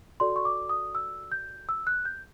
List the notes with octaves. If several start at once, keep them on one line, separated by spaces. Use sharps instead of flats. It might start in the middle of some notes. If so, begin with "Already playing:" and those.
F#4 A4 D5 C6
C#6
D6
D#6
E6
G6
E6
F#6
G6